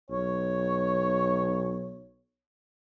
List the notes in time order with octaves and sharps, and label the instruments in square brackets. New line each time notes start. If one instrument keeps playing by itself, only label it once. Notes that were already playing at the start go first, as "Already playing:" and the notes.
[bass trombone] B1 [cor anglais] C#5